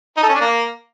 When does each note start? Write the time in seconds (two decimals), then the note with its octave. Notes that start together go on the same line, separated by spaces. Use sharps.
0.17 D#4
0.23 A4
0.29 C#4
0.35 D4
0.40 A#3